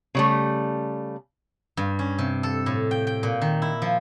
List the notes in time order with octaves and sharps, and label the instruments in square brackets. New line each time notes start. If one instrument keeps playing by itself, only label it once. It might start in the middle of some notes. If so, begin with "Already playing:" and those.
[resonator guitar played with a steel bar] C#3 G3 A3
[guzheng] G2
C#4
C3
A4
A2
G5
G5
A#2
D#3
E4
F3